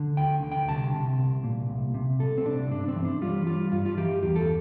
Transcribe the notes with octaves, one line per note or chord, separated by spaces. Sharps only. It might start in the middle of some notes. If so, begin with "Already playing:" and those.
Already playing: D3
D2 G5
D3
G5
C2 A5
C3
C2
A#2
C2
C3
C2 A4
C4
C3 D4
G2 D4
C4
E3
D4
G3 F4
G3 F4
G2 F4
F4
E3 G4
E2 G4
A4